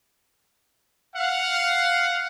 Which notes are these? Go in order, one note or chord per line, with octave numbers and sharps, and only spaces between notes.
F5 F#5